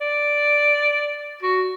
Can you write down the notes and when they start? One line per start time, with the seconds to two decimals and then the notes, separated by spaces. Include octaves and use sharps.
0.01 D5
1.42 F#4